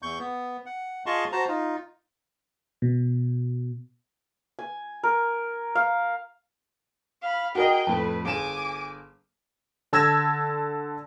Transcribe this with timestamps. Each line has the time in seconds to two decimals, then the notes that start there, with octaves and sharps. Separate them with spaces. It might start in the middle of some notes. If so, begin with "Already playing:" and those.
0.02 E2 C#6 G6
0.19 B3
0.66 F#5
1.06 F4 G#4 D#5 A5 C6 C#6
1.32 F#4 C5 A5 A#5
1.48 D#4 F4
2.82 B2
4.59 G#5
5.03 A#4
5.75 F5
7.22 F5 B5
7.55 F#4 G#4 A#4 D#5 G5
7.87 F2 A2 B4
8.25 G1 G#4 G#5 D6 E7
9.93 D3 A5 E6 G#6 A#6 E7